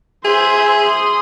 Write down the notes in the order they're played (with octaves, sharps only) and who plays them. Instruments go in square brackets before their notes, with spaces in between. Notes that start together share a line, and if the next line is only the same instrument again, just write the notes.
[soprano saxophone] G#4 [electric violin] C5 E5
[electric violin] C6 D#6